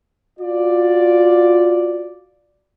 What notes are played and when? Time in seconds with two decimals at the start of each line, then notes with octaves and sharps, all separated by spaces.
0.39 F4 F#4 D5